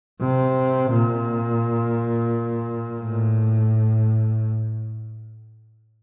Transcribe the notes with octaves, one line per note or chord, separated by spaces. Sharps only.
C3
A#2
A2